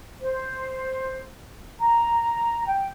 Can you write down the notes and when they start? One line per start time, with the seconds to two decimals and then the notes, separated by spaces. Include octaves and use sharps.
0.21 C5
1.80 A#5
2.66 G5